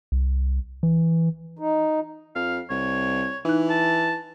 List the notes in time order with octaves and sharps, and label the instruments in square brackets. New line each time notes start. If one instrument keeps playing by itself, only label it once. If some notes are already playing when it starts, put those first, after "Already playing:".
[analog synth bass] C2
E3
[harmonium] D#4
[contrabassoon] F2 [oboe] F5
[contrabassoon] C2 [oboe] C#5
[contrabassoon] E3 [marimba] D#4 F#6
[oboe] A5